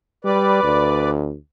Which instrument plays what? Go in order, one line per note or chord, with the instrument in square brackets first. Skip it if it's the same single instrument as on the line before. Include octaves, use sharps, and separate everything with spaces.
[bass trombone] G3 [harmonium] B4 D5
[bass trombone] D2